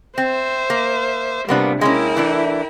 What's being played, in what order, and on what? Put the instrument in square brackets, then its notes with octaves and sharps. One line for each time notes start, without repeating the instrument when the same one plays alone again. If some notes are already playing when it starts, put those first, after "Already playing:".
[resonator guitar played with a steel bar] C4 [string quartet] C5 E5
[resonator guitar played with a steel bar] A#3
[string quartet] C3 F3 G3 [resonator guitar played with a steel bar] A#3 B3 D4
[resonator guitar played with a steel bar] G#3 A#3 C#4 [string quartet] E4 A#4 G5
[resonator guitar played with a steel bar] E3 A3 D4